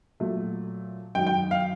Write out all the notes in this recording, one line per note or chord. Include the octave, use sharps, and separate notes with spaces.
A#2 F#3 A3
F#2 D#3 F#3 G5
G5
F5